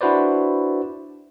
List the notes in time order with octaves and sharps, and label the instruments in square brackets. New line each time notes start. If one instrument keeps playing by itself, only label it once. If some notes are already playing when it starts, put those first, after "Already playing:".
[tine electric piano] D4 E4 F#4 B4 C5 D5